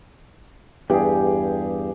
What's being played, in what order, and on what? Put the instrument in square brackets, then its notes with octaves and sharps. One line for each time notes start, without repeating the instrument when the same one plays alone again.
[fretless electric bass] E2 G2 [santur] G4 G#4